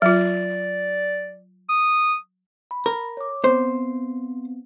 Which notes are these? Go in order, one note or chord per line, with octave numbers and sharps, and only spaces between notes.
F#3 F4 D5
D#6
B5
A#4
C#5 D6
B3 C4 C5